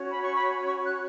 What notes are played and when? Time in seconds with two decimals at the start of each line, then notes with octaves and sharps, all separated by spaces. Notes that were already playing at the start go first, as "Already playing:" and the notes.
Already playing: C#4 F#4 C#5
0.11 B5
0.23 C#6
0.35 B5
0.66 C#6
0.85 F#6